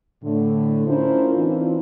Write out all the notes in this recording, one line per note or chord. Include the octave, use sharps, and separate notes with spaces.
A2 D3 A3
C#4 D4 E4 F4 A#4 C5
E3 C4 D4 D#4 F4